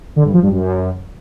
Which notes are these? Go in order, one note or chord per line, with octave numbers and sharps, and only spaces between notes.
D3
G2
F3
G2
F#2